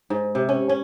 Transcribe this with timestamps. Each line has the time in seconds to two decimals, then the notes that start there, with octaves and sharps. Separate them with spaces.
0.10 G#2
0.35 C3
0.49 C#4
0.69 C#4